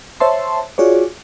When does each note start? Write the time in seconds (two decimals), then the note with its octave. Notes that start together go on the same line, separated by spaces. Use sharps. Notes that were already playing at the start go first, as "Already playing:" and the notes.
0.20 C5 C#5 E5 A5 C6
0.78 F4 F#4 G#4 C#5 D5